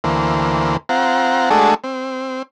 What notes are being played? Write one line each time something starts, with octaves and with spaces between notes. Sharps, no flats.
D2 E3 A#3 C5
C4 F4 F#5 A#5
G#3 A3 D4 F#4 G#4 A4
C4